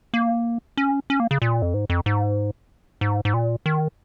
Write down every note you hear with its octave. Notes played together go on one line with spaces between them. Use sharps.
A#3
C#4
C#4
A#3
C#3
A#2
F2
G#2
F2
G#2
G#2
G#2
A#2
D#3